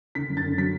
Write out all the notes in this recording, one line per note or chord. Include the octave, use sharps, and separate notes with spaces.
D3 B6
F#2
A6
D3
F#3 B6